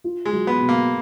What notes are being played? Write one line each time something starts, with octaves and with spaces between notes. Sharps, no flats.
F4
G#3
F#3
B3
B2
A#3